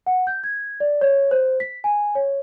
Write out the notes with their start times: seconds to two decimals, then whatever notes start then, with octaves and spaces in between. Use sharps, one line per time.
0.06 F#5
0.27 G6
0.44 G#6
0.80 D5
1.01 C#5
1.31 C5
1.60 B6
1.84 G#5
2.15 C#5